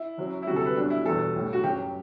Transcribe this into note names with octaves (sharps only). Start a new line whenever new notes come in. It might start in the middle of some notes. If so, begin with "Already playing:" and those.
Already playing: E4
F#1 F#2 F#3
E4
D2 C3 G3 F#4
A4
B4
B1 B2 G3 D4
E4
E2 B2 G3 A4
B1 A2 G3
F#4
F#1 F#2 F#3 G4